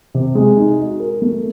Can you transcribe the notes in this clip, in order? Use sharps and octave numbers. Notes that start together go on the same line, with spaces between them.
C3
G#3
D#4
F#4
A#4
A3